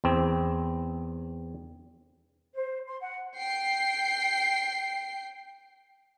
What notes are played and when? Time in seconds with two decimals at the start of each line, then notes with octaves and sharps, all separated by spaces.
0.04 E2 C4
2.53 C5
2.87 C6
3.00 F#5
3.38 G5 C7